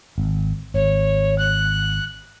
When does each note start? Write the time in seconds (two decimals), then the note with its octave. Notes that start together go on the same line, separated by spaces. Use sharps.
0.18 G#1
0.74 G#1 C#5
1.38 F#6